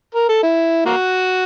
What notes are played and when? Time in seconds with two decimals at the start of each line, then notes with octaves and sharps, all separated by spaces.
0.15 A#4
0.29 A4
0.43 E4
0.86 A#3 F#4